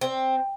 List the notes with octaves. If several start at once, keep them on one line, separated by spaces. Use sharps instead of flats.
C4